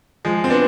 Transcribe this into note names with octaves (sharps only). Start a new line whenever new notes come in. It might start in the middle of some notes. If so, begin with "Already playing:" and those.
F3 G#3
C4
B3 D4